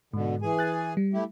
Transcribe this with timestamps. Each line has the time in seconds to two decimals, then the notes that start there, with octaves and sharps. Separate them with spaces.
0.13 G#2 B2 D3
0.42 E3 G#4 G#5
0.59 F#6 A6
0.97 G3
1.13 A3 E4 G4